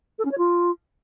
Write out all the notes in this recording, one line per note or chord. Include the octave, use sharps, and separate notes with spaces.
A4
C#4
C#5
F4